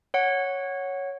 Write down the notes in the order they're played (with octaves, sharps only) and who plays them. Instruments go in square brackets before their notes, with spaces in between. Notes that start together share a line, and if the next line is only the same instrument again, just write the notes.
[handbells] C#5 F#5